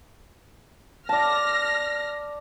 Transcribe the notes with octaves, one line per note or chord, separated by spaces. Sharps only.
D5 A5 F6 A#6